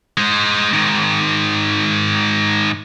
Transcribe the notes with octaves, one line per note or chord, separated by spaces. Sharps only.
G#3 C5
G#2 D#3